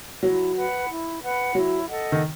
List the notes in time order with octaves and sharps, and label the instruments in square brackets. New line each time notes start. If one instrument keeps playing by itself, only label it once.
[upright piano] F#3 [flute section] E4
[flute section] B4 F#5 B5
E4
B4 F#5 B5
[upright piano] F#3 [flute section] E4
[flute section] A4 D#5 F#5
[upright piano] D#3